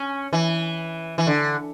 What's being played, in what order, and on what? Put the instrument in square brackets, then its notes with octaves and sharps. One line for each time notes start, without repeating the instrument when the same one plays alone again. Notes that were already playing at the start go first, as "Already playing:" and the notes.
Already playing: [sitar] C#4
E3
E3
D3